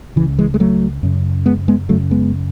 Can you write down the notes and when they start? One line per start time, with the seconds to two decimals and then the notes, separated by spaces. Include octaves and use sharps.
0.16 C#3 E3
0.20 C#2
0.38 E3 G#3
0.54 G#3
0.60 F#3 A3
1.03 F#2 C#3
1.46 G#3 B3
1.68 G#3 B3
1.89 F#2 C#3 F#3 A3
2.11 G#3 B3